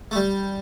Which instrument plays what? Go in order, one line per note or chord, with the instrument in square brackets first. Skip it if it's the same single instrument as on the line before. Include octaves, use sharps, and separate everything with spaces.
[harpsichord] A3
G3